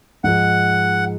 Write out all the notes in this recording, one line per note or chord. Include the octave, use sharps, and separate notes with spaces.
G#2 F3 G#3 F#5